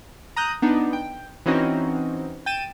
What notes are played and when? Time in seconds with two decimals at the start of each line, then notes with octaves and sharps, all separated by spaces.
0.37 A#5 D#6 F#6 G6
0.62 B3 D4 D#4
0.93 G5
1.46 E3 C4 C#4 D#4 F#4 D#5
2.46 G5 A6 D#7 E7